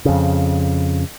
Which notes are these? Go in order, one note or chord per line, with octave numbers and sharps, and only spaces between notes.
F2 C#3